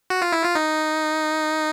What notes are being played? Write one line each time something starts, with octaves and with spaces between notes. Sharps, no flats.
F#4
F4
E4
F4
D#4